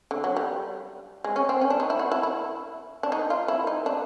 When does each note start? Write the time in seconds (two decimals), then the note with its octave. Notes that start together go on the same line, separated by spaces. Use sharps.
0.11 D3
0.24 F#3
0.37 G3
1.24 G#3
1.36 C#4
1.49 C4
1.61 C#4
1.70 D4
1.80 D#4
1.90 E4
1.99 F#4
2.12 E4
2.23 E4
3.03 D4
3.12 D#4
3.30 F4
3.48 E4
3.67 D#4
3.86 D4